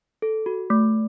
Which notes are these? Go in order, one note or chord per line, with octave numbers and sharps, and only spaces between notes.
A4
F#4
A3